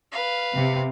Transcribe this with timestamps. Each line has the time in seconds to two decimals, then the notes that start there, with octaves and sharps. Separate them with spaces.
0.12 B4 F5
0.54 C3